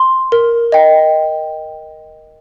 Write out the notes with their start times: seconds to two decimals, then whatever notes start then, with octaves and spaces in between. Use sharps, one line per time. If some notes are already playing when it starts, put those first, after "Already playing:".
Already playing: C6
0.32 A#4
0.72 D#5 G5